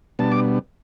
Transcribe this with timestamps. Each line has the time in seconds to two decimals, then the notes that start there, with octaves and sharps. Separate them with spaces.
0.19 B2 G3 B3 D4 A5
0.32 D6